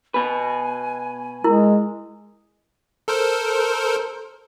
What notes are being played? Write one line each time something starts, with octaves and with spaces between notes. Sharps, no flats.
B2 B4 G#5
G#3 E4 A#4
A4 A#4 C5